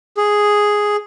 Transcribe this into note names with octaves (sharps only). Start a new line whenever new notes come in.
G#4